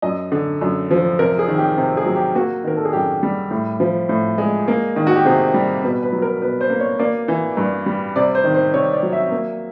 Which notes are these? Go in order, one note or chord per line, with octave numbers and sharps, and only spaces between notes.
F#2 D#5
D3
F#2
F3
C3 A#4
G#4
D#3
G4
C3
G#4
F#3
G4
A#3 F#4
D#3 A#4
A4
G#4
F#2 G4
G3
A2
F3
A2
G#3
A#3
D#3
F#4
G4
C3 G#4
G3
B2 B4
B4
F#3
A#4
B2 B4
C5
A#3
C#5
A#3 D5
E3
G2
G3
C3 D5
C5
D#3
C5
C3 C#5
D5
F#3
E5
A#3